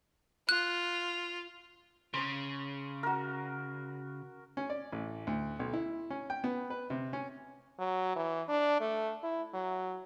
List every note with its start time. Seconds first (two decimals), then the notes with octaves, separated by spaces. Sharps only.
0.49 F4 F#6
2.14 C#3 C6 C#6
3.03 F#4 A#4
4.57 C#4
4.70 D5
4.92 A1
5.27 D2
5.59 B1
5.73 E4
6.10 C#4
6.30 G5
6.44 B3
6.70 B4
6.90 C3
7.13 C#4
7.79 F#3
8.16 E3
8.48 D4
8.80 A3
9.23 E4
9.54 F#3